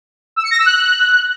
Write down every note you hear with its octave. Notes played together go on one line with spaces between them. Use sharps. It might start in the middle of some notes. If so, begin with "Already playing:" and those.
E6
C#7
A#6
E6
F#6